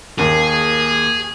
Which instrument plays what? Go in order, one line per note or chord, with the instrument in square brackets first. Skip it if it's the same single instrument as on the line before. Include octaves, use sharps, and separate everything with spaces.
[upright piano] D#2 A#3 [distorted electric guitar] G#4